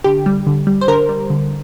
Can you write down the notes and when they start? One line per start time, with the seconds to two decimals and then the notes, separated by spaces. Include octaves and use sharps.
0.04 D3 G4
0.26 G3
0.47 D3
0.67 G3
0.81 C5
0.88 D3 A#4
1.09 G3
1.30 D3